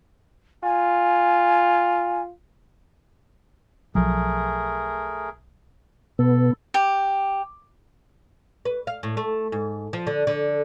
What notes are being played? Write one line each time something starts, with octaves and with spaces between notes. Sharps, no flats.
F4 G#5
B1 F3 F#3 A3 G#4 A#4
B2 B3 A4
G4
B4
F5
A2
A3
G#2
F3
D3
D3